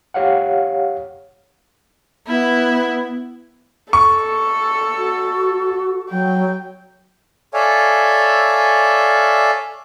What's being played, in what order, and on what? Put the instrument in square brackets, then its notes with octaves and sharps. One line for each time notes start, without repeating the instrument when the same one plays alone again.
[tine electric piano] G4 C#5 F5 F#5
[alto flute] B3 [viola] E4
[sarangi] A4 [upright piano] C#6
[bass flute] F#4
[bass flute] F#3 [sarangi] G5
[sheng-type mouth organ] A4 C#5 D5 E5 F5 G#5